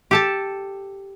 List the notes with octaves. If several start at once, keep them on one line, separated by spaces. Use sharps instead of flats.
G4 A4 A5